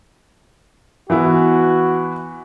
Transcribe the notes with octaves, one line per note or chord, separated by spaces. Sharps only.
E3 B3 E4 F#4